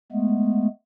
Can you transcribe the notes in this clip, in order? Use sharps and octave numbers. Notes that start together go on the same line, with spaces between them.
G#3 A3 B3